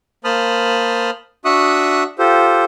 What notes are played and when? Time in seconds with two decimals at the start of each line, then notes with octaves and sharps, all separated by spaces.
0.24 A#3 C5 A5 B5 D#6 F6
1.45 D4 F#4 E5 C#6 D#6 F#6
2.19 F4 G4 A4 C5